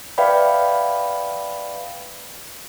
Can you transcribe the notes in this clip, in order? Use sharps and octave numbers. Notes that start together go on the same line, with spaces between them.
B4 D5 E5 F5 G5 B5